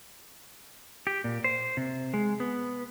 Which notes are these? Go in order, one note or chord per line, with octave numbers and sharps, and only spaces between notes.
G4
A#2
C5
C3
G#3
B3